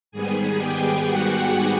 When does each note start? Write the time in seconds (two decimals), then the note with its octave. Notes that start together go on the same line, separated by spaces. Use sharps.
0.12 G#2 D#3 G3 B3 G#4 G#5
0.58 G4 G5
1.06 F#4 F#5